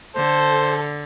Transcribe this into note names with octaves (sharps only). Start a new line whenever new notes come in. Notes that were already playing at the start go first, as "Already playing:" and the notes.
D3 A4 C5